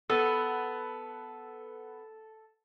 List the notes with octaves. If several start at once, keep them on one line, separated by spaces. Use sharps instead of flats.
B3 A4